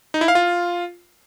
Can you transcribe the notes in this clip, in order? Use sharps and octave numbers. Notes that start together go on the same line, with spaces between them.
D#4
E4
F5
F4